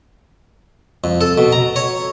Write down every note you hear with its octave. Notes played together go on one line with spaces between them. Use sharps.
F2
A4
B2
A#5
C#5